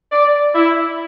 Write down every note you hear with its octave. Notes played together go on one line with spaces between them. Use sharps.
D5
E4